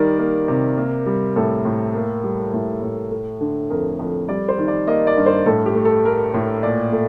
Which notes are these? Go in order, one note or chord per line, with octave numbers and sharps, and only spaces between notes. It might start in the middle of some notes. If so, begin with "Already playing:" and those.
Already playing: D#3 G3 A#4 D5
A#3
C3
A#3
G3
A2 A4
A2
A#3
G3
A2
A2
A3
D3
F2 A#4
F2
G3 D5
C5
D#3
D5
A#3 D#5
D5
G2
C5
A2 A4
G4
A3
A4
A3 A#4
A2
A#2 D5
A3